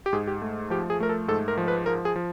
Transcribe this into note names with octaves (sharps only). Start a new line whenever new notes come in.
G4
G#2 G#4
G4
A3
F3 G4
G#4
A3 A#4
A4
G#2 A4
A#4
F3
B4
F3 A#4
G#4
F3